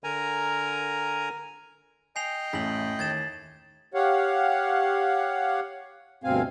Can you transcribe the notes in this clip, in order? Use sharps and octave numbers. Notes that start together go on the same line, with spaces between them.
D3 A#4 G#5 A#5
D#5 G5 G#5 C7 F7
A1 A3 B6 F#7
D#2 G#6 A6 E7
G4 C#5 F5 F#5
D2 G2 B2 C4 F5 G#5